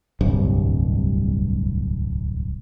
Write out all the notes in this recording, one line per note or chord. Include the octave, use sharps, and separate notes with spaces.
D1 C2 G2